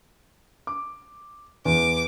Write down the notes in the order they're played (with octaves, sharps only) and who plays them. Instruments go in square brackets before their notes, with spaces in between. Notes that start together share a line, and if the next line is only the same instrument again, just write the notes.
[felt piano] D6
[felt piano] E2 [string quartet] D6